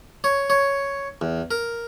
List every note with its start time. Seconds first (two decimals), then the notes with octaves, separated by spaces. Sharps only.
0.24 C#5
0.50 C#5
1.21 E2
1.51 A#4